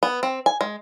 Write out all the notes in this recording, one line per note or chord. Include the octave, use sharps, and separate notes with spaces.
B3
C4
G#5
G#3